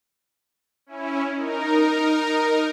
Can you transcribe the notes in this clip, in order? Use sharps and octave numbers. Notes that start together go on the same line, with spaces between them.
C#4 E4
D#4 A#4